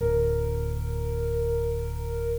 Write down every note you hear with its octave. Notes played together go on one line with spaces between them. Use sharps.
D1 A#4